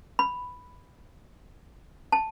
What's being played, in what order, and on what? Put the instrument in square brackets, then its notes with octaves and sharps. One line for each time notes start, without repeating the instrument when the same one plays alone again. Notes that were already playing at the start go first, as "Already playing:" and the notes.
[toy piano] B5
A5